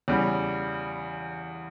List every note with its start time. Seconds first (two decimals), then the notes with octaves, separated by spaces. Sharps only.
0.08 E2 C#3 G3